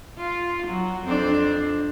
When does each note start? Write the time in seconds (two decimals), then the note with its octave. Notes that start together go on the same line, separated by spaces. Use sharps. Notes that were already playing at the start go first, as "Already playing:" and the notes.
0.18 F4
0.67 F#3
1.04 F2 C4 D4